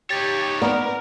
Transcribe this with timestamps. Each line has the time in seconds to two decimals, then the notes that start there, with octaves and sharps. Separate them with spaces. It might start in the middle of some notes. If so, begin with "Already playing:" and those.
0.10 D#4 G4 C#5 A6
0.62 B3 A#4 D5 A#5